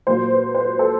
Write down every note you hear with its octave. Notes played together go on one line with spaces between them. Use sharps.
A#2 F#3 A#3 C5
B4
C5
B4
A4